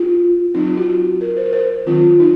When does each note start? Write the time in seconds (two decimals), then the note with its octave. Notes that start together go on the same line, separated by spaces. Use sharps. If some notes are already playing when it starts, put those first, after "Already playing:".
Already playing: F4
0.54 F#3 C4 D#4
0.67 F4
0.77 F#4
1.21 A#4
1.37 C5
1.45 A#4
1.53 C5
1.86 D#3 F#3 C4 F4
2.20 D#4